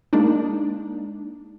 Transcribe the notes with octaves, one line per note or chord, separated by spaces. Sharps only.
G#3 A#3 D4 D#4